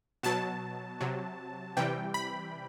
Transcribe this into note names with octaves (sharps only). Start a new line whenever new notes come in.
B2 F#3 A5
C3 F#3
C3 E3 G3 G5
B5